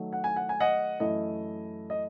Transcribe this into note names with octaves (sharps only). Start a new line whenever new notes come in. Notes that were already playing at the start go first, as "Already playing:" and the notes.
Already playing: D#3 F#3 A3 D#4
F#5
G#5
F#5
G#5
D#5 F#5
F#2 E3 A3 E4 D#5
D#5